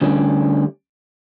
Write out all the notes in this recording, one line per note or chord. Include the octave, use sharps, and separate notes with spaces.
D2 D3 G3 C#4